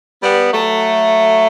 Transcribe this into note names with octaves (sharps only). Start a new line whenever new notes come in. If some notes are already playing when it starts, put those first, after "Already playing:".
G3 B3
F#3 A3